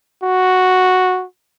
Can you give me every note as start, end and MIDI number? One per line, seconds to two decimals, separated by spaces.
0.23 1.25 66